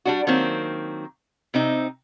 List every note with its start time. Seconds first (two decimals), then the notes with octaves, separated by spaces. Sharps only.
0.05 G3 D4 F#4
0.27 D#3 F#3 A#3 C4
1.54 C3 C4 D#4